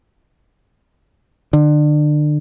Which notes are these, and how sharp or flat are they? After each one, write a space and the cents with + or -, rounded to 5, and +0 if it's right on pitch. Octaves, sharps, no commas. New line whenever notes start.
D3 +30